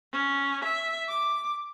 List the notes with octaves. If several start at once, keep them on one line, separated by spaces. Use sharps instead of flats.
C#4
E5
D6